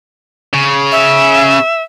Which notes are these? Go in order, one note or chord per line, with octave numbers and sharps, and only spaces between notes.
C#3
E5